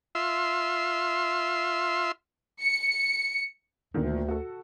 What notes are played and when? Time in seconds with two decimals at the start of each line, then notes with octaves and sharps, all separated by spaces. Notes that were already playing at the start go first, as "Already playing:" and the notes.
0.15 F4 E5 C6
2.60 C#7
3.94 D2 A#2 D3 D#3
4.28 F#4 A4